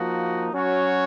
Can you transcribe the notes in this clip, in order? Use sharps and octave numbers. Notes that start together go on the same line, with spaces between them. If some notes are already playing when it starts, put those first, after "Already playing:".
Already playing: F3 A#3 D#4 F#4
F#3 C#4 F#4 C#5